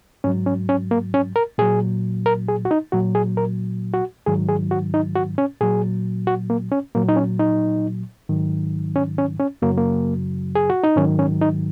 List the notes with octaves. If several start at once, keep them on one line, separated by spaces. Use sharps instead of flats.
G#2 F#3 C#4
C#4
C#4
A#3
C#4
A#4
A#2 F#3 G#4
A#4
G#4
F#4
D#4
A#2 F#3 F#4
G#4
A#4
F#4
G#2 D#3 F#3 G#4
G#4
F#4
D#4
F#4
C#4
A#2 F#3 G#4
F#4
A#3
C#4
A#2 F#3 A#3
D#4
C#4
D#4
G#2 D#3 F#3
C#4
C#4
C#4
F#2 C#3 F#3 A#3
A#3
G#4
F#4
D#4
G#2 D#3 F#3 C#4
C#4
D#4